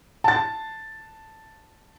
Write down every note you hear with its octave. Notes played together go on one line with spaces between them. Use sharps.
A5 A6